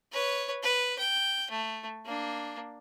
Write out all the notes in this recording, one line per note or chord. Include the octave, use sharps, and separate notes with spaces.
B4 C#5
B4
G5
A3
A#3 D4